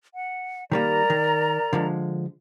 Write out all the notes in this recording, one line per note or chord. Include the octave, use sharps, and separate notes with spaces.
F#5
D#3 G3 A#3 A#4 D5 A#5
D#3
D3 F3 G#3